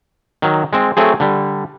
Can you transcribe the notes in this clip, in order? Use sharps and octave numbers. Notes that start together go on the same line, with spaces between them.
D#3 F#3
G#3 C4
F#3 A3 C4 G#4
D3 G3